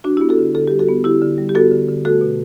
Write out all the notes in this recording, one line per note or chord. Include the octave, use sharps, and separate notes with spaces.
G3 D4 F#4
B3 E4 G4
F#4 A4
D3
D3 A4
G3 G4
F#4 A4
B3
D3 E4 G4
D3
G3
G4
B3 F#4 A4
D3
D3
A3 F#4 A4
B2